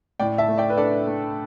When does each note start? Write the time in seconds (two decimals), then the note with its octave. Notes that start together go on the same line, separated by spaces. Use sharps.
0.19 A2 D5 G5
0.38 E5 A5
0.48 A3
0.58 D5 G5
0.70 B4
0.77 D4 A4 D5
1.06 A3